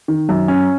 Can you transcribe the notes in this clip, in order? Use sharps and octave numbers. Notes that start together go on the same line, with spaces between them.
D#3
F#2
C#4